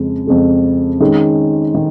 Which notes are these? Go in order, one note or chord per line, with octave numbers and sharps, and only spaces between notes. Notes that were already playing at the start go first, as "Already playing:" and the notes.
Already playing: F2 C#3 G#3
F2 C#3 G#3
D#3 G#3 C#4
D#3